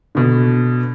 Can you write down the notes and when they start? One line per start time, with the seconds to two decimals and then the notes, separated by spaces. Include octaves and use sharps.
0.15 B2 D3